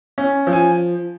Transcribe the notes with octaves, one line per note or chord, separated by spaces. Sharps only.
C#4
F3
G#5